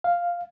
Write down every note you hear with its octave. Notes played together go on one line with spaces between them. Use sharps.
F5